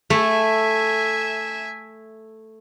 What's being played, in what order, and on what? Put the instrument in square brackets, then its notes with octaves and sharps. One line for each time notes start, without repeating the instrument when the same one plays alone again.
[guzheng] A3 [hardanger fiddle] E5 G#5